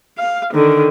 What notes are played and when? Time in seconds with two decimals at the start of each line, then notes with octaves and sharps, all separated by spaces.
0.18 F5
0.54 D3 D#3